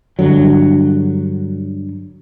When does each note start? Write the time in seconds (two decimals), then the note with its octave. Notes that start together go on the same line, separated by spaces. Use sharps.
0.19 G2 D3 F#3